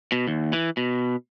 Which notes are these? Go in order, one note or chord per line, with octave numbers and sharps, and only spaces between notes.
B2
D#2
E3
B2